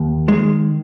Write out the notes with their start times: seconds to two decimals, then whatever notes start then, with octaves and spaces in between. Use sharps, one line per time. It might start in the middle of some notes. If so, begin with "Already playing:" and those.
Already playing: D#2
0.28 D#3 G#3